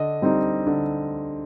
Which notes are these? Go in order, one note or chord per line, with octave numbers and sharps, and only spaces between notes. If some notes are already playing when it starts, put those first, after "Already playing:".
Already playing: D3 D#5
G3 C4 D#4
D3